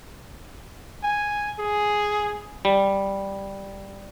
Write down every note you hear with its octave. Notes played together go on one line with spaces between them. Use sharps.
G#5
G#4
G3